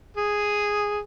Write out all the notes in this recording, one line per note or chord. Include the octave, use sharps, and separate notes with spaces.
G#4